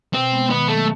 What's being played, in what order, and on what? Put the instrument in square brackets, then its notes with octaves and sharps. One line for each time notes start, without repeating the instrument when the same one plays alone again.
[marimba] B2 [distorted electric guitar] C4
[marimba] G#3 B3
[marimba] D#3 [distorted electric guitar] B3
[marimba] F#3 A#3 [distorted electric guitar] A3